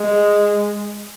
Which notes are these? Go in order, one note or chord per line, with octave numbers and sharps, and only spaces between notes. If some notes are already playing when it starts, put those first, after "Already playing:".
Already playing: G#3